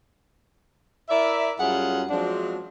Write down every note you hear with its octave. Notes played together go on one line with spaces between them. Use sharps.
E4 A#4 D5 E5
F#2 G3 C#4 F4 G#4 F#5
F3 F#3 G#3 C4 D4